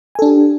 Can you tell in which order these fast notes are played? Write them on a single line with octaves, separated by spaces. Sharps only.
G#5 A4 D4 G4